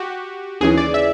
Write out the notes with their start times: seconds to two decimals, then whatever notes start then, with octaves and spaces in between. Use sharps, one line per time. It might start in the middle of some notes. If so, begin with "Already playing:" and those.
Already playing: F#4 G4
0.61 D#2 C#3 E3 G#4
0.78 D5
0.94 E5